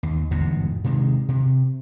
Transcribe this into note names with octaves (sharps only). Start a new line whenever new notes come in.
D#2
G1 E2 G#2 B2
C3 D#3 G#3
C3